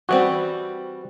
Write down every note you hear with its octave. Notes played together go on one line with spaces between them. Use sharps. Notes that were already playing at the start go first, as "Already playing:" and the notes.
E3 G3 C4 F#4